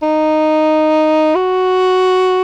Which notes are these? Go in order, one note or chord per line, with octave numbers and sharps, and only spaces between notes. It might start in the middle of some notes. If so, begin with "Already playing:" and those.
D#4
F#4